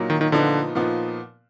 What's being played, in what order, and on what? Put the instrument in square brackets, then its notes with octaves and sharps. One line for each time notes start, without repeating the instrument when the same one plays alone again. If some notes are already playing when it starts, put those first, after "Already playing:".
Already playing: [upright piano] A#2 F#3 A#3 D#4
[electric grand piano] D#3
D#3
[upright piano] A#2 F3 B3 D#4 [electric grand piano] D3
[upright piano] A#2 F3 B3 D#4